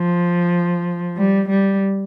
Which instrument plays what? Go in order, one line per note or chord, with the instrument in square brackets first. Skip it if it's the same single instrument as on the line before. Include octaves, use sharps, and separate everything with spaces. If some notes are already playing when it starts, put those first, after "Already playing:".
Already playing: [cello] F3
G3
G3